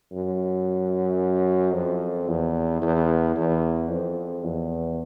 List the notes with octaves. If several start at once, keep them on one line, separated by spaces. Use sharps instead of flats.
F#2
F2
E2
E2
E2
F2
E2